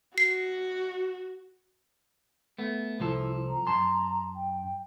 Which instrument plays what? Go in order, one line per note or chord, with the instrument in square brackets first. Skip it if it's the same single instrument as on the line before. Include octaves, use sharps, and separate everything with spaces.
[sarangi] F#4 [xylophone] C7
[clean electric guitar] A3 B3
[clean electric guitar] C2 F3 A4 [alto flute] E4
[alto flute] A#5
[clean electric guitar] F#2 A5 C6
[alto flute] G5